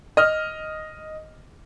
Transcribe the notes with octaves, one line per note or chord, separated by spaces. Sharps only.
D#5 F6